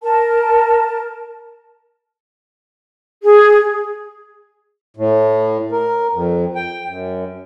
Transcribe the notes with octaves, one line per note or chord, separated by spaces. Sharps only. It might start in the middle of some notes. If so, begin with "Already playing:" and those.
A#4 A5
G#4
A2
A#4
F2
G5
F#2